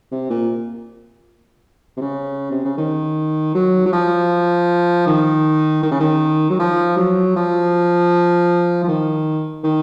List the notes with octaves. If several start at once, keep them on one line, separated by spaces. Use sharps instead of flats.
C3
A#2
C3
C#3
C3
C#3
D#3
F#3
F#3
F3
D#3
D#3
C#3
D#3
F#3
F3
F#3
F3
F3
D#3
D#3